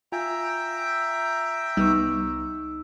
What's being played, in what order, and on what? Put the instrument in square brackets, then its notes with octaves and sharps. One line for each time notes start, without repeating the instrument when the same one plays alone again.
[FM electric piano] F4 G#5 [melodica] E5 G5 A#5
[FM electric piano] C2 B3 C#6 [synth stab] G3 [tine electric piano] D#4 E6